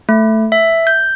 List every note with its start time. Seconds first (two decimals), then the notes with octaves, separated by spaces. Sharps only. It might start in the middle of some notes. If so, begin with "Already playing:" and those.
0.09 A3
0.52 E5
0.87 G6